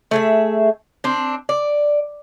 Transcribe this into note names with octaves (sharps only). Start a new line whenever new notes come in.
A3 G#4 E5
C4 D4
D5